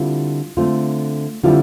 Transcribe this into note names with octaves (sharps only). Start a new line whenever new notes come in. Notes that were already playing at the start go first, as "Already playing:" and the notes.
Already playing: D3 G3 C4 E4 F4
D3 A3 C4 F4
D3 G3 C4 E4 F4